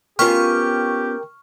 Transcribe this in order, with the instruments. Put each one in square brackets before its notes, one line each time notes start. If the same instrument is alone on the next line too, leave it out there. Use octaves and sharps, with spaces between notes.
[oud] B3 C#4 F4 [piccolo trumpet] G4 [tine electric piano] A#4 G5 [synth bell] C#6 F6